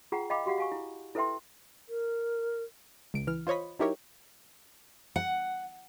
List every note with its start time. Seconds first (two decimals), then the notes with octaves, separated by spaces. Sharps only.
0.12 F4 G#4 F#5 G5 A#5
0.30 D#5 F5 G5 B5 D6
0.46 F#4 G4 F5 F#5
0.58 F5 G#5 C#6
0.72 E4
1.15 E4 A4 B4 E5 G5 C6
1.89 A#4
3.14 C#2 D7
3.27 E3 F6
3.47 F4 C5 C#5 D#5 B5
3.79 F#3 D#4 E4 G4 A#4 C#5
5.16 F#5